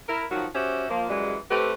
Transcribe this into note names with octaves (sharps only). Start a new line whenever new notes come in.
E4 A#4
D#3 F3 F#3 F#4
C#4 F#4 G4 C5 E5
F3 A#3
F#2 E3 G3 G#3
A3 C4 G4 B4